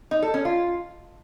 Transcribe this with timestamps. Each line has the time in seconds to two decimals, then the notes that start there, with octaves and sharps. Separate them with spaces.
0.11 D#4
0.22 A4
0.34 C#4
0.45 F4